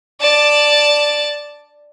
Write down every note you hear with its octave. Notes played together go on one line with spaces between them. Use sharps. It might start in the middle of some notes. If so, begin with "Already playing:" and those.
D5 A5